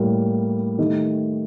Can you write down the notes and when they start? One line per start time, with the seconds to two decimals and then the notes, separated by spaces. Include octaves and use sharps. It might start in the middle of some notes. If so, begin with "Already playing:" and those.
Already playing: A2 G3 A#3
0.79 D#3 A3 D#4 G4